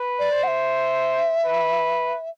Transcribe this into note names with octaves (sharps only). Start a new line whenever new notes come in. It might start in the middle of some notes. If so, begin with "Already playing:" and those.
Already playing: B4
D5
C5
F#5
E5
B4